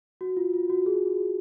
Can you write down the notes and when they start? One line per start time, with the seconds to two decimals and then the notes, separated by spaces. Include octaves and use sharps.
0.21 F#4
0.37 F4
0.54 F4
0.70 F#4
0.86 G#4